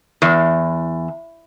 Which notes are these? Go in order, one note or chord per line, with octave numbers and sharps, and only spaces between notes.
E2